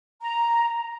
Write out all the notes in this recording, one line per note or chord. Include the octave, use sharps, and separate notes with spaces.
A#5